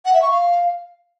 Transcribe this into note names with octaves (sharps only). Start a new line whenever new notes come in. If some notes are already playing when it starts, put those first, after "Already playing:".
F#5
E5
C#6
F5